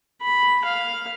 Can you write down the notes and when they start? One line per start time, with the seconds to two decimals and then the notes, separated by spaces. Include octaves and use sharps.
0.22 B5
0.65 F5